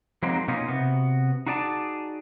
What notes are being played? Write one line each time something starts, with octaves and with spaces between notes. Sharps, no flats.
F3 F#3 G#3 A#3 C4 D#4
B2 A#3 C#4 D#4 F4
C3 B3 F#4
D#4 F#4 G#4 D5 G#5 A5